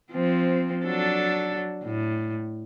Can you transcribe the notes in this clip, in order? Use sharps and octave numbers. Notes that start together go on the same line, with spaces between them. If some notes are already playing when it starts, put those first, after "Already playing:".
F3 C4
F#3 D4 A4
A2